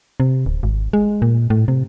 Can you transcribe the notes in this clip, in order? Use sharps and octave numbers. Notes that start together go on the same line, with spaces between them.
C3
D1
G#1
G#3
A#2
A2
C3